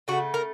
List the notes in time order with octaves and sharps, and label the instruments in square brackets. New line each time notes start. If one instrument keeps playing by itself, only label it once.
[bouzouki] C#3 A3 F#4
A#4